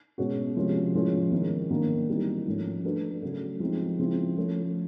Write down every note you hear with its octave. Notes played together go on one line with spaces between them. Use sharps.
B2 G#3 C#4 F#4
C3 F3 G#3 C#4
A2 F3 G#3 C#4
D#3 G#3 C#4
D#3 F#3 A#3 D4
E3 G3 C4 D#4
G#2 F3 A3 C#4
A3 D4 F#4 B4
C#3 F#3 A3
F3 G#3 C4 D#4
C#3 F3 G#3 C4 E4
F3 A3 C#4